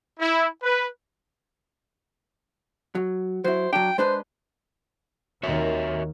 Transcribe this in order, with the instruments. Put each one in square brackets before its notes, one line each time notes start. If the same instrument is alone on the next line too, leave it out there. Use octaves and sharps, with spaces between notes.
[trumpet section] E4
B4
[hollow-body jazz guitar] F#3
[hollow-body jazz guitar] F#3 E4 [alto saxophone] C5
[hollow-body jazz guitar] F#3 D4 [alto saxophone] G5
[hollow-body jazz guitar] G#3 D4 B4 [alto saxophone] C5
[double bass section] D#2 D#3 [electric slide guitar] F#4 C#5 E5